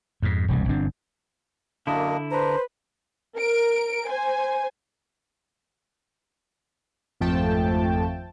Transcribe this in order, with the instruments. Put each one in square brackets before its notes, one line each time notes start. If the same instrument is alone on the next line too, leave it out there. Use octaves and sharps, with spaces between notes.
[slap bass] F2 G#2
E1 C2 G2
G1 G2 C4 D4
[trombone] F#2 [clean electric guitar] D3 E4 [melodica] A#3 D4 D#5
[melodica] D4 A#5 [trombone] B4 [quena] C5
[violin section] A#4 D7
C5 G#5
[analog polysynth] G#1 F2 F3 A3 G5 A5